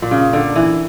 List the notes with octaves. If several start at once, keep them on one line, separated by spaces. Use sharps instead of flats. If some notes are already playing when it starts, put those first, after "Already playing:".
A#2
C#3
D3
E3